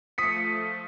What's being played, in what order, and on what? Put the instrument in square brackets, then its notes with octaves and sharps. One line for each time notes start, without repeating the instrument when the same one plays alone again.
[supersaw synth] F3 A3 [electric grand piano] D#6 B6 C#7